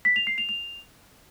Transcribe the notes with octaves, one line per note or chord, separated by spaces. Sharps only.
B6
F7
C7
F7
F7